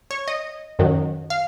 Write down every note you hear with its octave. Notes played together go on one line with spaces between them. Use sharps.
C#5
D#5
F#2 D#3 F#3
F5